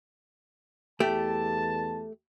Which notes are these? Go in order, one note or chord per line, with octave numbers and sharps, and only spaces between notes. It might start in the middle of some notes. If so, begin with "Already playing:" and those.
E2 A3 G4 A5